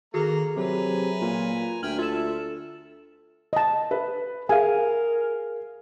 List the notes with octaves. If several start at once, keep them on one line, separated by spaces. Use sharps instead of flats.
D#3 A#3 F#4 G#4 A4 A#5
C3 F#3 B4 G#5 A#5
A#2
D2 E5 G5 G#5 F6 F#7
F4 A4 E5 A5 E7
D#5 A5
B4
G#4 A#4 F5 G#5